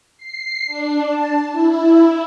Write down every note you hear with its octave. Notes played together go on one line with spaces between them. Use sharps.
C7
D4
A5
E4